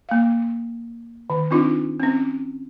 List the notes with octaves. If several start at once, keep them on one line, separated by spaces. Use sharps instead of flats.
A#3 F5
D#3
C4 D4 D#4 F4
C4 C#4